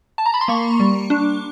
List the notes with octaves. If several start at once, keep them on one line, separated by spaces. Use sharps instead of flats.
A5
A#5
B5
C6
A#3 C#6
G3
D4